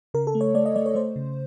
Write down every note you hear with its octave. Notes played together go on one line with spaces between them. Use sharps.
C#3 A#4
A4
A3
C#5
A3 D5
D#5
A3 D5
C#5
A3 C5
C#3